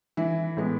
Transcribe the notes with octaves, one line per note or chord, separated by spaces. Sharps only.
E3 E4
A2 G#3 B3